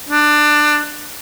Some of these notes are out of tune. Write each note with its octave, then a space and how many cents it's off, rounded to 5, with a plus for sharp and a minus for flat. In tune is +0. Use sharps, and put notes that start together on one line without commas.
D4 +20